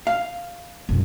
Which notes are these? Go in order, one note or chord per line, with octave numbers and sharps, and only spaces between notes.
F5
B1 F#2